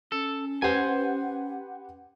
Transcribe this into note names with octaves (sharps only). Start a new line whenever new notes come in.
C#4 A4
G4 B4 C5 F#5 G#5